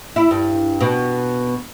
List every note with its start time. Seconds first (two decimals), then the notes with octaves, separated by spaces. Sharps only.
0.16 E4
0.31 G2
0.81 B2